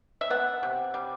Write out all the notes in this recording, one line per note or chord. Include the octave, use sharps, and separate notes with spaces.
E5
B3 F#5
C3
G3